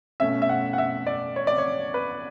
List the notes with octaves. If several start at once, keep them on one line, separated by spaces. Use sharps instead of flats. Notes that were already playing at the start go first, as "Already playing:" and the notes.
B2 A3 C#4 E5
E5
F#5
F#5
E5
D5
C#5
D5
C#5
B4